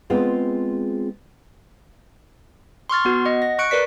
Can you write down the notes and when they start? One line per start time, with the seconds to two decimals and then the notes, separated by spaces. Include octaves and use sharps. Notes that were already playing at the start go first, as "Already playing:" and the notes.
0.10 G#3 B3 C4 F4 G#4
2.90 C6 C#6 F6 A6
3.05 B3 F#4
3.25 D#5 F#5
3.42 A#6
3.59 C#6 F#6 C#7 D7
3.71 A#4 B4 D5 B6